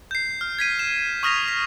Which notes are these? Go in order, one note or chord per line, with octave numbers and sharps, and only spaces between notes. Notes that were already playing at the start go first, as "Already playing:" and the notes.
G6 C7
F6
G#6 B6 D#7
E7
C#6 D#6 F6 A#6 B6 F7
B6